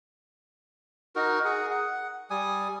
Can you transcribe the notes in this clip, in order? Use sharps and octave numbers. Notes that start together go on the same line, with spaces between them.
D#4 F#4 A#4
G#4 F#5
F#5
G3 G#5 D#6